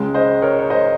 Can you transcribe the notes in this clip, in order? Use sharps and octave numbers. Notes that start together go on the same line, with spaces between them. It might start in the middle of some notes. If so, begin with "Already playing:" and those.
Already playing: C#2 C#3 G#3
C5 D#5
A#4 C#5
C#5
C5 D#5